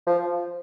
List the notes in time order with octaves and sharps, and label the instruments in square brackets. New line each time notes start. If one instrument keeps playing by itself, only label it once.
[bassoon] F3